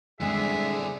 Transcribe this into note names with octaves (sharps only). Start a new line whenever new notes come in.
C2 D3 G#3 C4 D4 G#4 E5